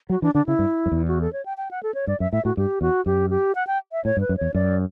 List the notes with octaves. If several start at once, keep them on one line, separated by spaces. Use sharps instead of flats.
F#3 F#4
E3 D4
D3 D4
C#3 E4
G2
F#2
E2
F#4
A4
C#5
G5
G5
F#5
A4
C#5
G2 D5
F#2 E5
A2 E5
A2 F#4
G2 G4
E2 F#4
F#2 G4
G4
F#5
G5
E5
A2 C#5
G2
B4
F#2
E2 C#5
F#2 D5